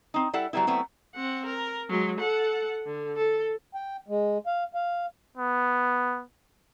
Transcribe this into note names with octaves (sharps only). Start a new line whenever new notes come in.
C4 D#4
G3 E4 A4 F#5
F#3 G3 A#3 B3 E4
F#3 A3 B3 C4 E4
C4 F#5
A#4
F#3 G#3
A4 F#5
D3
A4
G5
G#3
F5
F5
B3